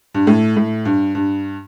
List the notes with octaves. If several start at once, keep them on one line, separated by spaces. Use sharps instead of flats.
G2
A2
A2
G2
G2